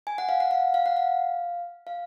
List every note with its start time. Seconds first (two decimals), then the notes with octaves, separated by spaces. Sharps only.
0.07 G#5
0.18 F#5
0.29 F5
0.40 F#5
0.51 F5
0.74 F5
0.86 F#5
0.97 F5
1.87 F5